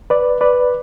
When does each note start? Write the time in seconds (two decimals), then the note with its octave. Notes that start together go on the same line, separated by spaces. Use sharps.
0.10 B4 D5
0.41 B4 D5